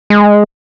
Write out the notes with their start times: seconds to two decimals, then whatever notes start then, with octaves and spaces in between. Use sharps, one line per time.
0.10 G#3